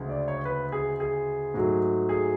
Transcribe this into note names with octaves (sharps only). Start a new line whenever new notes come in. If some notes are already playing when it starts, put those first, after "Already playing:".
Already playing: D2 C#3 G#3
D5
C#5
B4
G#4
G#4
G#2 F#3 A3
G#4